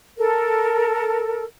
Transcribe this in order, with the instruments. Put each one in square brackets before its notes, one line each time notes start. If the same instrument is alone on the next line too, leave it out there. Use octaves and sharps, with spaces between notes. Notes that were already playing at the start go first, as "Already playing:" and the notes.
[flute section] A4 A#4